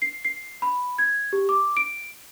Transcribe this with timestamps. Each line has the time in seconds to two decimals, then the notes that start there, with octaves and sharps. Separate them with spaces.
0.02 C7
0.25 C7
0.62 B5
0.98 G#6
1.33 G4
1.49 D6
1.77 D7